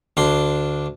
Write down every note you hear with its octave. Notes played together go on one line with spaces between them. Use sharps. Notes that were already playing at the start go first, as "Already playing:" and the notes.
D2 D4 C6